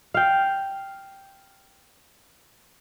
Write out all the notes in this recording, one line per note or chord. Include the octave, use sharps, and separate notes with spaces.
F5 G5